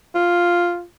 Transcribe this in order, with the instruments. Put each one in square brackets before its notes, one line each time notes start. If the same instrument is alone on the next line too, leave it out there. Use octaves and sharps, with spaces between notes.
[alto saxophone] F4